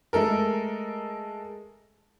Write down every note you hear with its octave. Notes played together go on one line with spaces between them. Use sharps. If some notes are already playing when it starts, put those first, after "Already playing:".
G#3 A3 A4 A#4